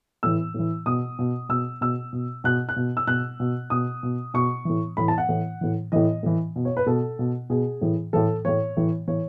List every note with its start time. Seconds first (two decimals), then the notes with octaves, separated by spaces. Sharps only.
0.23 A2 E3 E6
0.54 A2 E3
0.86 B2 D#6
1.19 B2
1.49 B2 E6
1.81 B2 E6
2.13 B2
2.44 B2 F#6
2.69 F#6
2.76 B2
2.97 E6
3.07 B2 F#6
3.40 B2
3.70 B2 D#6
4.03 B2
4.34 B2 C#6
4.65 A2 E3
4.97 A2 E3 B5
5.08 A5
5.18 F#5
5.29 A2 E3
5.61 A2 E3
5.92 A2 E3 D#5
6.23 A2 E3
6.56 B2
6.65 C#5
6.77 B4
6.87 B2 A4
7.19 B2
7.50 B2 G#4
7.82 A2 E3
8.13 A2 E3 A4
8.45 A2 E3 C#5
8.77 A2 E3
9.07 A2 E3 C#5